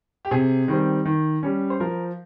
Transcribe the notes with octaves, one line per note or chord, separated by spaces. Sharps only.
G4
C3 G#4
D#3 G3 C4
D#3
G3 C#4
C5
F3 A#4